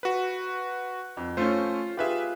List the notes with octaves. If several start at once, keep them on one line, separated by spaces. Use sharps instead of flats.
F#4 B4
F2
A3 C#4 F4 C5
F4 G4 G#4 B4 E5